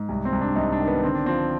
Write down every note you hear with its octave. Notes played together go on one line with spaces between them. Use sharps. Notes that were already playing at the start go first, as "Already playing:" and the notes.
Already playing: G#2
C2
C4
C2
D4
C2 D#4
D4
D#3
B3
D3 C4
D4
F3 C4